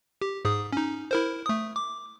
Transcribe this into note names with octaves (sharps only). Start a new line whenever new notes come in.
G4
G#2 G#4 D#6
C#4 D#4
E4 A#4 C5
A3 D#6
D6